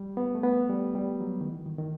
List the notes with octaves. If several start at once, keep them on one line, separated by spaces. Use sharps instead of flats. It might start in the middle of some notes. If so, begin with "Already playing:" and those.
Already playing: G3
B3
A3
B3
G3
G3
F#3
D#3
E3
D#3
D#3